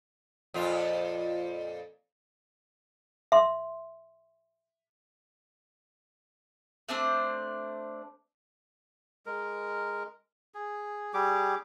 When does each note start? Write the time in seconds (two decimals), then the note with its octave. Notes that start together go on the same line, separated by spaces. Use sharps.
0.54 F2 A#2 F4
3.32 E5 C6
6.89 A3 C4 D4 C5
9.26 G#3 A#4
10.54 G#4
11.14 G3 G4 G#4 D6